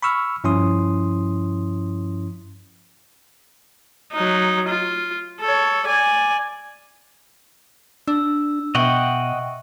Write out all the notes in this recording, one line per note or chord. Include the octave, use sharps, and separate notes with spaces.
B5 C#6 E6 F6
G2 F3 C#4 E4 C6 D#6
F#3 D#4
F4
A4 C#5
D5 G#5
D4 E6
B2 D#5 E5 F#5 G5 C#6